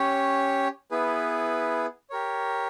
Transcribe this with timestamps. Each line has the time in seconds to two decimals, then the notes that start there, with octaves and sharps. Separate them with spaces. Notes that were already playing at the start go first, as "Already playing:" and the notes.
Already playing: C#4 G4 C#5
0.91 B3 E4 G#4 B4
2.10 G4 A#4 C#5